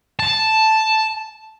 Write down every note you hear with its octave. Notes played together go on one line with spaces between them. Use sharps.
A5